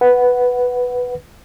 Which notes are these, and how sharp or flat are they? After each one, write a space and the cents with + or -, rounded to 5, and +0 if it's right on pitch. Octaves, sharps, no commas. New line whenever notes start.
B4 +0 F#5 +0